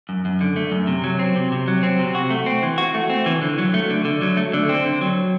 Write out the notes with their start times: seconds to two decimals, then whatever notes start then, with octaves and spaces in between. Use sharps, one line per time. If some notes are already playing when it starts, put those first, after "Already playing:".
0.09 F#2
0.25 F#2
0.41 D3
0.56 A3
0.72 F#2
0.87 C3
1.04 F#3
1.19 C4
1.36 C3
1.52 C3
1.68 F#3
1.83 C4
1.99 C3
2.15 F#4
2.30 A3
2.46 C4
2.63 E3
2.78 F#4
2.94 A3
3.10 C4
3.26 E3
3.42 D3
3.58 F#3
3.74 A3
3.90 D3
4.05 D3
4.22 F#3
4.37 A3
4.53 D3
4.69 C4
4.85 D3
5.01 F#3